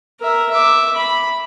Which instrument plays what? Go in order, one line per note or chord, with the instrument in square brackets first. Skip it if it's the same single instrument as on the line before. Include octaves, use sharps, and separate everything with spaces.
[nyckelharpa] A#4 E5
E5 D6
B5